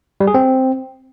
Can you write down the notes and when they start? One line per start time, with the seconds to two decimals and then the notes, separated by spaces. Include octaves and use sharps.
0.20 G3
0.27 G#4
0.34 C4